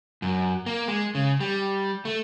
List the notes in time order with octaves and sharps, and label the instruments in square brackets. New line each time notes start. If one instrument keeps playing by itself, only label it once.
[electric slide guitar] F#2
A#3
G#3
C#3
G3
A3